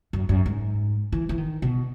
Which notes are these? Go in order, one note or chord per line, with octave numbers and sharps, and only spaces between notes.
F#2
F#2
G#2
E3
E3
D#3
B2